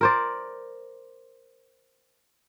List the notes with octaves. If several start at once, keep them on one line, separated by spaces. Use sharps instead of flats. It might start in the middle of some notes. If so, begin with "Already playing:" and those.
A#4 C5 D5